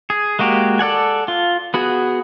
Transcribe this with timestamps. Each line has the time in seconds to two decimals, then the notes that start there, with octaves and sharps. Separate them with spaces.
0.10 G#4
0.39 G#3 A#3 F#4 G4
0.79 A4 D5 F#5 G#5
1.28 F4
1.74 B3 F#4 G#4